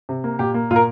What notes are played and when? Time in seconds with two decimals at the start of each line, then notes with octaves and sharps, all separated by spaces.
0.09 C3
0.24 A#3
0.39 A#2 G4
0.54 A#3
0.71 A#2 F4
0.76 A#4